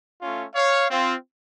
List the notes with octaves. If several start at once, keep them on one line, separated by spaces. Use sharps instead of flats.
A3 C#4 F4
C#5 F5
C4 F4